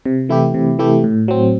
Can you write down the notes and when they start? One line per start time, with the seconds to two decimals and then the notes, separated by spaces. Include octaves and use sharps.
0.06 C3
0.29 E3 A3 E4 G4
0.54 C3
0.79 E3 A3 E4 G4
1.04 A2
1.28 F#3 C4